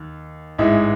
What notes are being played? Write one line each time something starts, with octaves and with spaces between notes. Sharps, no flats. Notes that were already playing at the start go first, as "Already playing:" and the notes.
Already playing: D#2
A1 G#2 E3 G#3 E5